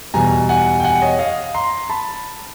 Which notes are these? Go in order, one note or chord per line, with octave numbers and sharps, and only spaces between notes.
E2 B2 G3 G#5 A#5
F#5 G#5
G5
F#5 G#5
C#5 D#5
D#5 F5
A#5 C6
A5 B5